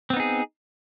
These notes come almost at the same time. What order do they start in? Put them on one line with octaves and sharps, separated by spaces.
C4 B3 D#4 G#4